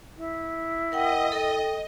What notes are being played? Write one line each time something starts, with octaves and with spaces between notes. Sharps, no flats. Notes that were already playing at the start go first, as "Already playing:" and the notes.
E4
A#4 D#5 F#5 G5
A4 G5